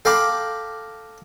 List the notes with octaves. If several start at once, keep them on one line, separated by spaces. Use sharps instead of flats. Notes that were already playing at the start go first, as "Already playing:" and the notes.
A4 F5 G5 A#5 B5 D6